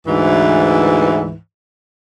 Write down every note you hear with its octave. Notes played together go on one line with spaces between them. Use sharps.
D2 G#2 E3